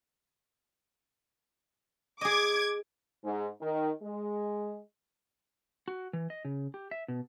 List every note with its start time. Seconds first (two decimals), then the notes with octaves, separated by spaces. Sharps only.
2.21 G#4 D#5 D6 G#6
3.23 G#2
3.61 D#3
4.02 G#3
5.88 F#4
6.13 E3
6.30 D#5
6.45 C#3
6.74 G4
6.91 E5
7.08 B2